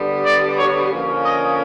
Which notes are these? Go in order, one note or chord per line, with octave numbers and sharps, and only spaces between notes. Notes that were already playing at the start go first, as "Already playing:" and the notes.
Already playing: D3 G3 B3
D5
C#5
D3 F3 A#3 C#4
D#5